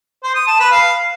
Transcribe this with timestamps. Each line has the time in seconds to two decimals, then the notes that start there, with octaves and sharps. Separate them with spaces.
0.23 C5
0.35 D#6
0.47 A5
0.59 B4
0.71 F5